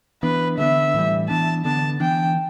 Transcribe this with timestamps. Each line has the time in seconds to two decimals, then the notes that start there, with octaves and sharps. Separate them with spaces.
0.23 E3 B3 D4 B4
0.58 D3 G3 B3 D4 E5
0.94 A2 E3 G3
1.29 E3 B3 D4 A5
1.65 D3 B3 D4 A5
2.00 E3 B3 D4 G5